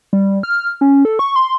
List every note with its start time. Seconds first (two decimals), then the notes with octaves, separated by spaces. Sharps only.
0.13 G3
0.43 F6
0.81 C#4
1.05 A4
1.19 C#6
1.36 C6